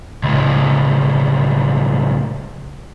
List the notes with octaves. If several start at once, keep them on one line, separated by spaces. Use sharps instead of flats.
C#2 A2